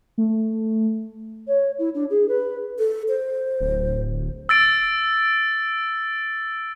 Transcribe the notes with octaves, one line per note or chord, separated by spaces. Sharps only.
A3
C#5
E4
D4
G#4
B4
A4
C5
D1
E6 A6 D7